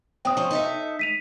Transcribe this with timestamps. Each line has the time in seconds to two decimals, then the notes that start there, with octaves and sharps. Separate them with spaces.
0.25 E2 A2 C4 G5 D#6
0.37 F3 C#4 C5
0.51 D#4 A4 E5
0.99 B6 D#7 F7